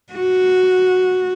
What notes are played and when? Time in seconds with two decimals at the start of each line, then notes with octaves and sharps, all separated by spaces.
0.13 F#4